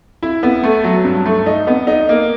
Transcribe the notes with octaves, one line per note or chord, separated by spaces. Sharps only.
E4
B3
A3
F#3
G2
A3
D#4
B3
D#4
A#3